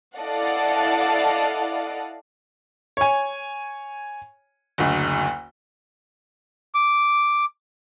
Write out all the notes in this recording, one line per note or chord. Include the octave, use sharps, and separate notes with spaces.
E4 A4 D5 D#5 F5 F#5
C#5 G#5
F#1 D2
D6